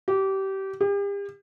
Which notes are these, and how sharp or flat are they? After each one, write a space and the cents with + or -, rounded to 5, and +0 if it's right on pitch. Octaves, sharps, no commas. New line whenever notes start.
G4 -25
G4 +40